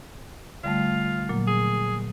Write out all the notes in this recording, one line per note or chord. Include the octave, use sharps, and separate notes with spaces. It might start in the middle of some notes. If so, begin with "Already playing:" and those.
D3 G3 A3 F4
A#2 F#3 A#3
G#4